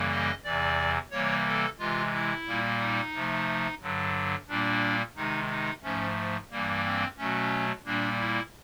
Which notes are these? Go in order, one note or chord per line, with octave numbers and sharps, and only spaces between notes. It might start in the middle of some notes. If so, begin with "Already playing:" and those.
Already playing: F#2 C#3 E3 G3 A#3
D#5
E2 C3 E3 D5
C3 E3 G3 A#3 C#5
A4
C3 E3 G#3 F4
E4
A#2 G3 A#3
D#4
C3 F3 A3
G2 D3 F#3
A#2 G3 A#3 D4
C3 D#3 G#3 D#4
D#4
G#2 F3 A3 C#4
G2 E3 G3 A#3
C4
B2 F#3 A3 C#4
A#2 G3 A#3 D4
E4